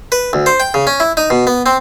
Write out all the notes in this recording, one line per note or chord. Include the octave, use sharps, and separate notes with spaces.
B4
D2
C5
G5
C#3
C#4
E4
D#4
B2
B3
C4